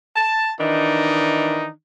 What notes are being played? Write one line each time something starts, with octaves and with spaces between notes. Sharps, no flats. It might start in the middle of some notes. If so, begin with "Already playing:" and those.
A5
D#3 E3 D4 D#4